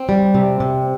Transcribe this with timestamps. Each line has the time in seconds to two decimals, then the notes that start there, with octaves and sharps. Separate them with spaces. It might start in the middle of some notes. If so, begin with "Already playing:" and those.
Already playing: C4
0.09 G3
0.34 C3
0.60 C3